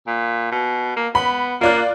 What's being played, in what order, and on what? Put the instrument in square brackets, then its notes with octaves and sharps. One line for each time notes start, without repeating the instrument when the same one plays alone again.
[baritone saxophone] A#2
B2
A#3
[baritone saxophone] B3 [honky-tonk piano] B5
[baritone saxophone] A#3 [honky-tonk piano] F4 D5 F#6